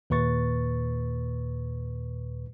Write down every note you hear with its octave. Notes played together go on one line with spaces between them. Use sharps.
D#2 A#2 B4 C#6 A6